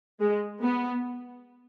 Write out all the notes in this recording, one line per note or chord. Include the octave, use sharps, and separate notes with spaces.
G#3
B3